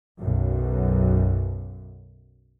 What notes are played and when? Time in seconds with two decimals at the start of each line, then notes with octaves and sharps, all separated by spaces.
0.20 B1 F#2